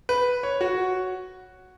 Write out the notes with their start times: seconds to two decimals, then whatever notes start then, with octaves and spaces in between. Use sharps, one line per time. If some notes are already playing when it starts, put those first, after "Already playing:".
0.09 B4
0.43 C#5
0.61 F#4